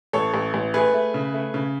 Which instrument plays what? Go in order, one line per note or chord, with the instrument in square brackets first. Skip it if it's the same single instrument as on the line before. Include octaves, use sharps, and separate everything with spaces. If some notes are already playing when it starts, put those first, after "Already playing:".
[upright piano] A1 A4 C#5
A1
A1
A3 G#4 B4
A3
C#3
A3
C#3